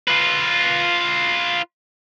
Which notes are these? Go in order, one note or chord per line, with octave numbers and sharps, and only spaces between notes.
F4 B4